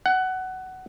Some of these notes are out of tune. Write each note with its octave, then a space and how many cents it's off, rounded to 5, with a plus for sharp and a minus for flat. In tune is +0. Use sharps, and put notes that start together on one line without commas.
F#5 +15